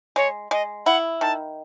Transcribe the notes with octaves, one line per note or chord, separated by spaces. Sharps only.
G#3 C#5
G#3 D#5
E4 F#5
D#3 A5